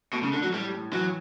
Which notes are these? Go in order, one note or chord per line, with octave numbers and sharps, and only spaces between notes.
B2 A3
C#3
D3 A3
F#3
A2 G3
A2
E3 F#3